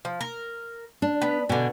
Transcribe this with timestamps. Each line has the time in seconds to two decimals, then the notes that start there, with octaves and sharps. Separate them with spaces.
0.05 F3
0.21 A#4
1.02 D4
1.21 B3 B4
1.49 B2 D3 G#5